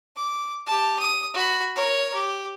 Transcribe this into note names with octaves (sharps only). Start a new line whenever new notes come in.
D6
G4 A5
D#6
F#4 B5
A#4 C#5
G4